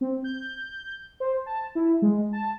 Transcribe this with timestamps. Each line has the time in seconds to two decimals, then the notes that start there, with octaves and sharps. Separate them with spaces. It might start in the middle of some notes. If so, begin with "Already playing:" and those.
0.01 C4
0.24 G6
1.20 C5
1.46 A5
1.75 E4
2.02 G#3
2.33 A5